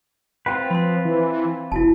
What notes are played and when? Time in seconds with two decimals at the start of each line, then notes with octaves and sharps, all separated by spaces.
0.46 C4 F4 B4 F#5 G5 A#5
0.71 F3 B5 C6
1.05 E3
1.72 F1 E4 F#4 A5